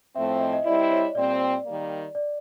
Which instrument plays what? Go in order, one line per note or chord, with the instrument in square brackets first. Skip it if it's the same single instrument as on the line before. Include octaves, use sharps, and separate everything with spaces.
[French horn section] A2 F3 A3 C4 [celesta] E5
[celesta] E5
D#5
D#5
[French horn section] G3 C4 E4 [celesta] D5
[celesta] C#5
[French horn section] A#2 G3 C4 [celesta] D5
[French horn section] D#3 G3 A#3
[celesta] D5